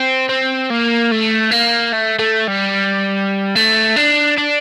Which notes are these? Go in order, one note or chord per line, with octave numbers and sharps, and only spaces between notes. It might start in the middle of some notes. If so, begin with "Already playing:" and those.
Already playing: C4
C4
A#3
A3
A#3
A3
A3
G3
A3
D4
D4